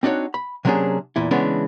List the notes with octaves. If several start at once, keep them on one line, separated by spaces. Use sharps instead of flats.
C4 D4 D#4 F#4 C#5
B5
C3 F#3 A#3 C#4 D4 G#4
E2 A#2 E4
C#3 E3 G#3 B3 C#4 D4